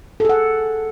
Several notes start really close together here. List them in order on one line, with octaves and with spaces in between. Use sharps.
A4 G#4 F#5